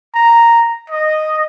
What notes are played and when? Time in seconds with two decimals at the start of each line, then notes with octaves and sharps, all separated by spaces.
0.15 A#5
0.90 D#5